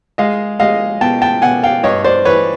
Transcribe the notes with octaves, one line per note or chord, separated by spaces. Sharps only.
G#3 D#5 F5
G#3 D#5 F5
B2 G5 A5
G5 A5
B2 F#5 G#5
F5 G5
G2 C#5 D#5
C5 D5
E3 B4 C#5